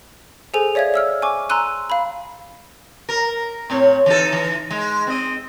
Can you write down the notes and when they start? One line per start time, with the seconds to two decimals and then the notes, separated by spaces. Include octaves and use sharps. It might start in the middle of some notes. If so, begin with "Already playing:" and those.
0.54 G#4 A4 C5 G#5 F7
0.75 C#5 D5 E5 F5 G#6
0.94 E5 E6 F6
1.22 G#5 C#6 D6
1.49 G#5 A#5 C6 E6 F#6 D#7
1.90 F5 B5
3.09 A#4
3.70 A2 C4 C#5
4.06 E3 D#4 A4
4.32 E3
4.71 G#3
5.07 C4 D#5